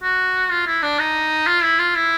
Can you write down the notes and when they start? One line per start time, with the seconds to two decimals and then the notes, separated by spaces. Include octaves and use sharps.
0.03 F#4
0.50 F4
0.67 E4
0.83 D4
0.99 D#4
1.47 F4
1.63 E4
1.79 F4
1.95 E4